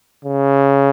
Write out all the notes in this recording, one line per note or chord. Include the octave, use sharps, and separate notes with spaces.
C#3